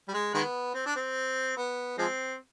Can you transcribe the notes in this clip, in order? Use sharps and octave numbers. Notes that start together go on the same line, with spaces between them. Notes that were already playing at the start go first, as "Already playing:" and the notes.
G3
G#3
D#3 G#3 B3
C4
D4
C4
B3
F3 G#3 C4